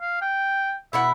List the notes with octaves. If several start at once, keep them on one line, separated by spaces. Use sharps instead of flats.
F5
G5
B2 E4 E5 F#5